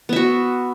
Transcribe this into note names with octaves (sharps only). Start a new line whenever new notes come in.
B3 F#4 E5